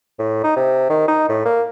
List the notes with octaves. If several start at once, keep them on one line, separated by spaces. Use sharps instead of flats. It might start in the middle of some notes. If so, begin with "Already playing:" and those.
A2
D#4
C3
D#3
D#4
A2
A#3